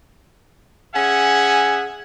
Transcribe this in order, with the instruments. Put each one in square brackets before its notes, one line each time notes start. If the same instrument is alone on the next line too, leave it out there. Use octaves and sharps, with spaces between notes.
[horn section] C#4 G#4 E5 F#5 G#5